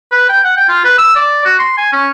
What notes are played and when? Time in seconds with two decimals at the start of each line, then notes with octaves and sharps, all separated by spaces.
0.12 B4
0.29 G5
0.44 F#5
0.57 G5
0.69 F4
0.84 B4
0.98 E6
1.16 D5
1.45 F#4
1.59 C6
1.78 G#5
1.93 C#4